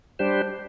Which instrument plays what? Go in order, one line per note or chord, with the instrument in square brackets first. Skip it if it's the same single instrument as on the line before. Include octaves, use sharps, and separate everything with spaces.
[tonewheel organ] G3 D4 G4 C5